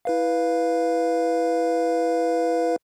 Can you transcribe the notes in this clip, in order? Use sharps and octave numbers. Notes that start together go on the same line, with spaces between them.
E4 B4 F5